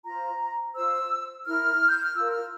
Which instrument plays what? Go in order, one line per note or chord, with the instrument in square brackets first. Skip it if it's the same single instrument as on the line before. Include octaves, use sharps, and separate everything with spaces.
[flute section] F4 C5 A#5
F4 C5 E6
E4 A#4 F6
G6
F6
F4 A#4 E6
F6